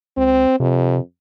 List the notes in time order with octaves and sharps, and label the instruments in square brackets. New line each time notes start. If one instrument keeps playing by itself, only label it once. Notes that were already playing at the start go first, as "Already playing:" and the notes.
[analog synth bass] C#2 [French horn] C4
[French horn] F2 [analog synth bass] C3